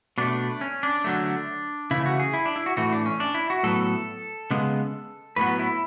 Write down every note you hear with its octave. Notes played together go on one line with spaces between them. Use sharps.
B2 A3 D4
C#4
D4
D3 F#3 A3
C#3 E3 A3 E4
F#4
G#4
E4
D4
E4
F#4
A2 E3 A3 F#4
D4
C#4
D4
E4
F#4
A2 F#3 B3 A4
C#3 G#3 B3
A2 F#3 B3 B4
E4